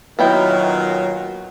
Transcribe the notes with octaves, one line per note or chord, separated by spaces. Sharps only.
A#2 D#3 F#3 B3 E4 B4 D#5 G5